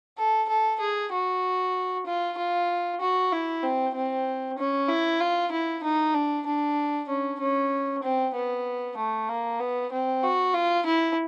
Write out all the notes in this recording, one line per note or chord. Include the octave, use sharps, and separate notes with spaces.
A4
A4
G#4
F#4
F4
F4
F#4
E4
C4
C4
C#4
E4
F4
E4
D#4
D4
D4
C#4
C#4
C4
B3
A3
A#3
B3
C4
F#4
F4
E4